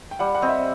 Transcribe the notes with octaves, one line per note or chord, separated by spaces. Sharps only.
G5
G3 F#5
F#5
C4 D#5
E5